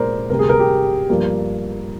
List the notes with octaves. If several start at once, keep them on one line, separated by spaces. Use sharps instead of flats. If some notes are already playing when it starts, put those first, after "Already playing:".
Already playing: A#2 G#3 A#4 C5 D5
D2 C3 G3 A#4
G#4
A#4
G4
G2 F3 A#3